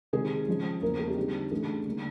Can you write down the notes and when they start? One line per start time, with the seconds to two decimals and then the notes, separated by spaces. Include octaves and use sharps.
0.13 C3 D#3 G#3 G#4
0.47 C#3 F3 G#3
0.82 E2 C#3 F3 A#3 A#4
0.99 G#4
1.08 G4
1.17 D3 G3 C4 D#4
1.51 C#3 E3 A3 D4 G#4
1.86 D3 G3 A#3 D#4